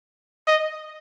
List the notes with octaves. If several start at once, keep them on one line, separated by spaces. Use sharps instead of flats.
D#5